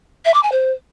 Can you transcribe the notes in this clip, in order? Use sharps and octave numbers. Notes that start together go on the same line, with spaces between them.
E5
D6
G#5
C5